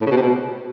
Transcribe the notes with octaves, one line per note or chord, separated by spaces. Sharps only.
A2
C#3
B2
C3
B2